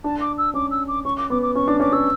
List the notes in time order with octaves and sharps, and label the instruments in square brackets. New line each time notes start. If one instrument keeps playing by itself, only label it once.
[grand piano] D4 [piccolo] A5
[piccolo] D6
E6
[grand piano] C#4 [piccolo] D6
[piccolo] E6
D6
[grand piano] C#4 [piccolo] C#6
[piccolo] D6
[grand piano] B3 [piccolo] D6
[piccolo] D6
[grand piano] C#4 [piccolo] C#6
[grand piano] D4 [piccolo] D6
[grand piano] C#4 [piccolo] D6
[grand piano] C#4 [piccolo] E6